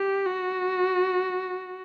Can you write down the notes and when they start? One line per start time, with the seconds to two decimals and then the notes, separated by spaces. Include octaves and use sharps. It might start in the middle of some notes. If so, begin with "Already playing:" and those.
Already playing: G4
0.26 F#4